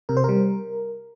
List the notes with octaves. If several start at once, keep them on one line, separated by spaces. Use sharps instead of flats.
C3 A#4
C5
G3 A#4